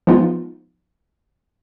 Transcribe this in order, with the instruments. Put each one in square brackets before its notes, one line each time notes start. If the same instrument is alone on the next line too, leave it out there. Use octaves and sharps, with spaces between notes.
[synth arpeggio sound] F3 G#3 B3 D#4 F4